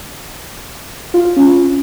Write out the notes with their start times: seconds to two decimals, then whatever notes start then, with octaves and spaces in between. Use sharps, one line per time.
1.14 F4
1.25 F4
1.36 C#4